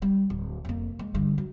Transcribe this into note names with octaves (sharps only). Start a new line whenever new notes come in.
G3
D1
F1 A#3
G#3
G2 D3
F#3